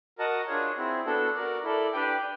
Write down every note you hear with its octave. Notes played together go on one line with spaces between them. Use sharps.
F#4 A#4 D#5 F#5 A5
D4 F4 G#4 C#5
C4 E4 G#4
B3 D4 F#4 A4
F#4 A#4 D5
E4 A4 D5
D4 G4 B4 D5 G5